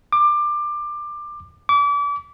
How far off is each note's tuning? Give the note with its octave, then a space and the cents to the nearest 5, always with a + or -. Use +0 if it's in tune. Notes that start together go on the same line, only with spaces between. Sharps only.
D6 +20
D6 -35